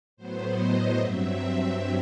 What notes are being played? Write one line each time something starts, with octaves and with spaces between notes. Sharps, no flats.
A2 F#3 B3 C5
D#5
G2 F#3 C4 E5